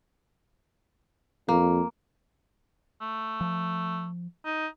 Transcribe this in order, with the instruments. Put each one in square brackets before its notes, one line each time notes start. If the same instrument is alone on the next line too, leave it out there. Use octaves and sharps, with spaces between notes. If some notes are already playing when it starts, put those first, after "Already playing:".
[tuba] F2 [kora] A#3
[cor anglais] A3
[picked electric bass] F3
[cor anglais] D#4